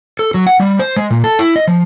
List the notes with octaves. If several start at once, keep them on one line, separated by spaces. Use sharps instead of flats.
A4
F#3
F#5
G3
C5
G#3
A#2
A4
E4
D#5
F3